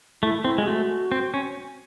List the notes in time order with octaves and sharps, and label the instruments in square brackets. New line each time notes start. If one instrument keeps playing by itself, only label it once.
[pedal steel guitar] A3 [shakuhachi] E4
[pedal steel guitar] C4 [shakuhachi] E4
[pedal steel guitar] G#3
[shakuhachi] G#4
[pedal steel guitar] A3 [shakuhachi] F#4
[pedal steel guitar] C4
C#4